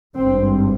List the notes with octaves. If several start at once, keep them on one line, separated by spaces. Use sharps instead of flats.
G#1 G2 C4